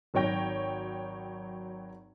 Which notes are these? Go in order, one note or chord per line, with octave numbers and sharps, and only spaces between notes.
G#1 F#3 C#5 G5 A#6